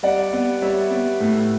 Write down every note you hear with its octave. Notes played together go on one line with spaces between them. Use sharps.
G3 D5 F#5
B3
G3 C#5 E5
B3
A2